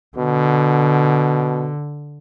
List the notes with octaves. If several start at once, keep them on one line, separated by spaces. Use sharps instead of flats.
B2 D3